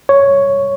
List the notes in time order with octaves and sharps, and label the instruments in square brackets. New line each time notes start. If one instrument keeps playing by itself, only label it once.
[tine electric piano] C#5